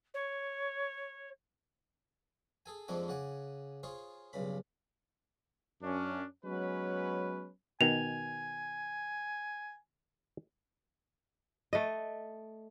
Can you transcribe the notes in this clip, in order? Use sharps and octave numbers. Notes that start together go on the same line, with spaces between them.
C#5
G#4 A4 G#5
F2 G#2 F3 C4 D4 G#5
C#3 F#5 G#5 D6
F4 G#4 C5 C#5
B1 G2 C#3 B5
F#2 C#4 D4
F#3 G#3 B3 C#4 B4
B2 D#3 G#5 F7
A3 D#5